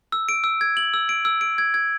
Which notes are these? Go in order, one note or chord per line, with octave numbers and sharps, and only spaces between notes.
E6
D7
E6
G#6
F#7
E6
D7
E6
D7
G#6
G#6